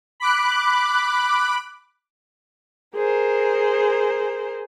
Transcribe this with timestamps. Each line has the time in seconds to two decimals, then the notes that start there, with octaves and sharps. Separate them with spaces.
0.20 B5 D6 F#6
2.96 G#4 A#4 C5